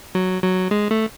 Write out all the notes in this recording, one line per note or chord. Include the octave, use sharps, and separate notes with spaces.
F#3
F#3
G#3
A3